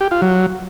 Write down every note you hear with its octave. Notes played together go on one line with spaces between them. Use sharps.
G4
F4
F#3